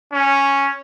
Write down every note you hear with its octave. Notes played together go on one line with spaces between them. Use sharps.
C#4